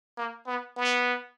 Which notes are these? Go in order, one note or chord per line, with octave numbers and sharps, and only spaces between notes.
A#3
B3
B3